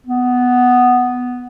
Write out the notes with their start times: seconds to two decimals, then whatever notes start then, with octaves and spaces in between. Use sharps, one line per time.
0.07 B3